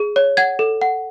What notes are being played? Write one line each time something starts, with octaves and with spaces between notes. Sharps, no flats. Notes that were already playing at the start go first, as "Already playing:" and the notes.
Already playing: G#4
C#5
F#5 G#6
A4
F#5